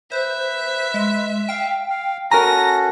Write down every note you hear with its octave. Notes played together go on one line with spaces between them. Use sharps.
B4 C5 E5
G#3
F5 G5
F5
C#4 F#4 A4 A#4 G#5 A#5 A#6